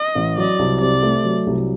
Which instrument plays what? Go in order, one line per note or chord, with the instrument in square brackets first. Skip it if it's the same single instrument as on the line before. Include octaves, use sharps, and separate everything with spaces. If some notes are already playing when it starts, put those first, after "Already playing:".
Already playing: [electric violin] D#5
[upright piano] A1
[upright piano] F#3 [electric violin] D5
[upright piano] C2
[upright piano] C3 [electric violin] D5
[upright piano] A3
F#3
C2